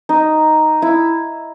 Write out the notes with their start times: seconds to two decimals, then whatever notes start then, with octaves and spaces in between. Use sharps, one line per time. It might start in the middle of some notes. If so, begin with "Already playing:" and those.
0.09 D#4
0.82 E4